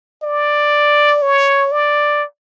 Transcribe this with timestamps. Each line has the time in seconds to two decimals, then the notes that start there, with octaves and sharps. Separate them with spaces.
0.23 D5
1.22 C#5
1.72 D5